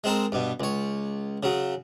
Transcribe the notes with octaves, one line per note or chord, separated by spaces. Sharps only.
G#3 C4 A4 A#4
G2 B2
C#2 C#5
C#3 F#3